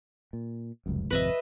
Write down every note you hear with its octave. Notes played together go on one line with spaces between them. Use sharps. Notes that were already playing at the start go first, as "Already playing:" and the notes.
A#2
F1 C#2 F#2
G#1 F2 C3 B4 D#5 E5